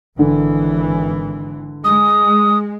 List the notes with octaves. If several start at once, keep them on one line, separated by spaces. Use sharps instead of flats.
G#1 D3 E3
G#3 D#6